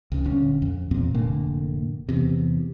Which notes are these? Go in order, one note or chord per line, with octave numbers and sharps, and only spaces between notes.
C#2 C#3
D#1 D3 C#4
F2
E2 A#2 C4
F1 A2 D3 A#3
E2 C3